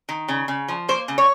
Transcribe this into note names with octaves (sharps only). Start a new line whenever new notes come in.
D#3
C#3
C#3
F3
A#3 C5
C#3
C#5